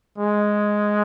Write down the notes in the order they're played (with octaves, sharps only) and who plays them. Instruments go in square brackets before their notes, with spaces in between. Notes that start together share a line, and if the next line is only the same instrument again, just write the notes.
[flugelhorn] G#3